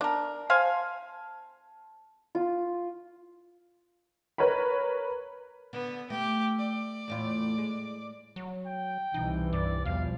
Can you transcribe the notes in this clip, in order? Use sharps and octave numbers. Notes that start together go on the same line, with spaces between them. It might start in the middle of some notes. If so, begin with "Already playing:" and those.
D4 A#4 A5
C5 F5 G#5
F4
A#4 B4 C#5 A#5 B5
D3 B3
A3 G4
D5
E2 A2 F4
G#3
F#3
G5
C2 E3 D#4
G2 D5
E2 B2 F3 G3 F5